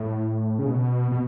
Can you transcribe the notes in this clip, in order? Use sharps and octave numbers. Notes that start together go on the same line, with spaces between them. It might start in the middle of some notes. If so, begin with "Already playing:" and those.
Already playing: A2
C#3
B2
B2